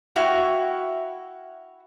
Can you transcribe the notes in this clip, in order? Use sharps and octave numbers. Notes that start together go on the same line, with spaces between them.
E4 F#4 F5 G5